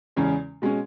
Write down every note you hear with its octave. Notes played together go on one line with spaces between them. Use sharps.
E2 C#3 G#3 C#4
B2 G#3 C#4